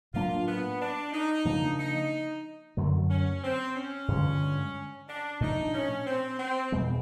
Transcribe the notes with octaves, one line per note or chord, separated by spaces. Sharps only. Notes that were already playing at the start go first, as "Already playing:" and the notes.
A2 F#3 A#3 D4 F4
B3
D4
D#4
C#3 F3 A#3 D4
D#4
F#2 D3 F#3 A3
C#4
C4
C#4
G2 D3 F3 G#3
D4
A#2 F3 A3 D4 D#4
C#4
C4
C4
E2 B2 G#3 B3